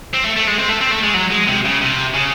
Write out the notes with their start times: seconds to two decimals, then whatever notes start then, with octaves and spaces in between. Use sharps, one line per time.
0.14 C4
0.25 A3
0.37 A3
0.48 G#3
0.59 C4
0.69 A3
0.81 C4
0.91 A3
1.03 G#3
1.14 F#3
1.31 G#3
1.47 C3
1.65 C#3
1.82 C3
2.14 C#3